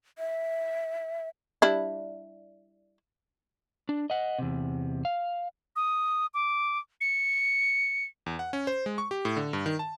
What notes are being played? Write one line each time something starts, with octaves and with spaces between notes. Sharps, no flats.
E5
G3 D4 E4
D4
D#5 F#5
E2 C3
F5
D#6
D6
C#7
E2
F#5
C#4
C5
G#3
C#6
G4
A2
D3
G2
D#3
A5